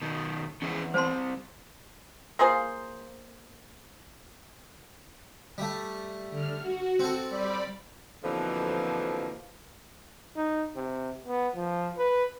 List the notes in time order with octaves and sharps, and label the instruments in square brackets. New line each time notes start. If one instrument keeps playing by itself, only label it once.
[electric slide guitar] B2 D#3
[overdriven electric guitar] E2 [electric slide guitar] C#4 G#4 E5
[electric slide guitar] G3 C4 [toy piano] C5 A5 C6
[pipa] A#3 F4 G#4 C5
[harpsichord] G3 A3
[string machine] D3 F6
F#4
[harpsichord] C4 A4
[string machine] G3 D5 B5
[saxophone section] F2 B2 D3 E3 F3 A#3
[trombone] D#4
C3
B3
F3
B4